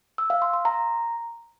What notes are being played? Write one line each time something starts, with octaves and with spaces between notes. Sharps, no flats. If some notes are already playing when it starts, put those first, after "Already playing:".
E6
F5
C6
C6
A#5